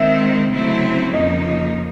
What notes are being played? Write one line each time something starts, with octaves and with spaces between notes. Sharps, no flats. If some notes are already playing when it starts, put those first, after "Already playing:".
Already playing: D#3 G#3 C4 E5
C#3 F#3 A3 C4 E4
F2 C#3 F3 A#3 D#4 D#5